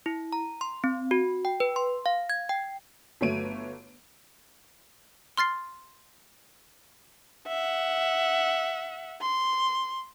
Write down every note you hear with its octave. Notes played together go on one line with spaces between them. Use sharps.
E4
A#5
C6
C4
F#4
G5
B4
C6
F5
G#6
G5
G1 F#3 A3 C#5 D7 D#7
C6 F6 A6 C7
E5 F#5
C6